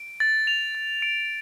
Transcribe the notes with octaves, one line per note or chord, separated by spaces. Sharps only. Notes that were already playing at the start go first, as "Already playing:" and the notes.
Already playing: D7
A6
F7
A6
D7